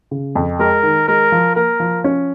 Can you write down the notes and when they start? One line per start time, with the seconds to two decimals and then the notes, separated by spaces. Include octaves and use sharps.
0.11 C#3
0.35 F2
0.59 G#3 A#4
0.83 D#3
1.08 G#3 A#4
1.32 F3
1.56 A#3 A#4
1.80 F3
2.04 C#4